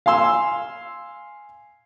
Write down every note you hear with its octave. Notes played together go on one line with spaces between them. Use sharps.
F5 G#5 C6 E6